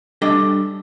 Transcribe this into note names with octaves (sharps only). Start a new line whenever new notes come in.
G3 D4 A4 D#5 G5